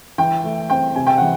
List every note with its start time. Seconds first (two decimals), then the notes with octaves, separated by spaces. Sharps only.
0.18 E3 G5
0.44 A3
0.70 C4 G5
0.96 C3 G#5
1.07 G5
1.17 E3 F#5